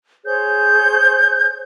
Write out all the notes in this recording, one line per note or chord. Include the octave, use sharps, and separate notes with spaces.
G#4 C5 C#5 G6